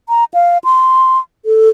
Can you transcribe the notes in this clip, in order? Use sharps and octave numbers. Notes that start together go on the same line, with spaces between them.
A#5
F5
C6
A4